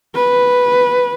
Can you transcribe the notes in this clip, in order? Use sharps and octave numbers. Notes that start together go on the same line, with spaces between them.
B4